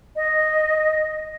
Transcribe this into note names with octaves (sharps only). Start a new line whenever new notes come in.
D#5